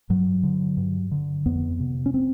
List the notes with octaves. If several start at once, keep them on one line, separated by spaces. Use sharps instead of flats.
G2 F#3
D3
G2
D3
F2 B3
C3
C#4
C4